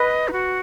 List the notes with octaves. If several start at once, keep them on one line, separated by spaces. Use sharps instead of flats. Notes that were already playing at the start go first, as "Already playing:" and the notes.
Already playing: B4 D#5
D#4
F#4